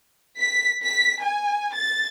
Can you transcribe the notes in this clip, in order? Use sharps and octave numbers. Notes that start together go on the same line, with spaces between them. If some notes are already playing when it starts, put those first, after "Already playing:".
B6
B6
G#5
A6